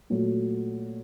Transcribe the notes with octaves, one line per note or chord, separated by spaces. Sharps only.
A#2 F#3 A3